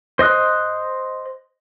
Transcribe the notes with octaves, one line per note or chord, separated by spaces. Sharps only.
C5 D#5 D#6 F#6